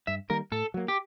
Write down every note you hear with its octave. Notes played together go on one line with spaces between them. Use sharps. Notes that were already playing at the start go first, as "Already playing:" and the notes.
G2 E5
D#3 G3 A#3 A#4
A2 A4
F#3 A#3
G4